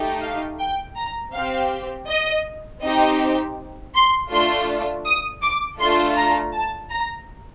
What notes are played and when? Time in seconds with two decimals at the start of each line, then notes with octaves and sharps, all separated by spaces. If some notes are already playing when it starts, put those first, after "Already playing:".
Already playing: A3 D#4 G4
0.22 F5
0.59 G5
0.97 A#5
1.33 C4 G4 F5
2.08 D#5
2.82 C4 D#4 G4 D#5
3.94 C6
4.30 A3 D4 F4 C6
5.05 D#6
5.42 D6
5.79 A3 D4 F4 A4 C6
6.17 A#5
6.53 A5
6.90 A#5